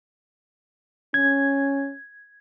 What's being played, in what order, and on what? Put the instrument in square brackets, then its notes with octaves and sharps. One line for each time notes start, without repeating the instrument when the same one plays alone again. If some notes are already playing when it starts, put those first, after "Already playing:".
[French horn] C#4 [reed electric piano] G#6